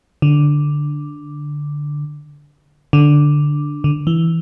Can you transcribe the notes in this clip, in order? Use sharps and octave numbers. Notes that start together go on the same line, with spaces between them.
D3
D3
D3
E3